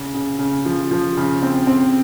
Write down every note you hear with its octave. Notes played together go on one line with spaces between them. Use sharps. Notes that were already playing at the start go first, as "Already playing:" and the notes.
Already playing: C#3
C#3
C#3
F3
F3
C#3
C4
C4